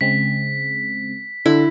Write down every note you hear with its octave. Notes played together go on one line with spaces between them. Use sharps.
C#3 G#3 C4 B6
D3 E4